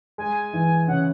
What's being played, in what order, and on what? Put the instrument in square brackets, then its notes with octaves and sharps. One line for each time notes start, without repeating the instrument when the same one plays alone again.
[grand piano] G#3 [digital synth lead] G#5
[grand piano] E3
[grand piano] C#3 [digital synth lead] F#5